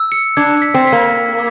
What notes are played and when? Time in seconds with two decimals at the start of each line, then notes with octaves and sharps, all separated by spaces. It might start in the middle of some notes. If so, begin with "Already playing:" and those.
Already playing: E6
0.12 C#7
0.37 D4 G#6
0.62 B6
0.74 C4
0.87 B6
0.92 A#3
1.11 B6